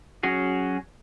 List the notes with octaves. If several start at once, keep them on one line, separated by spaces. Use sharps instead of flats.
F#3 C#4 F#4 G#4